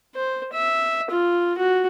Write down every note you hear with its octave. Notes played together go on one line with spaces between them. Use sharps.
C5
E5
F4
F#4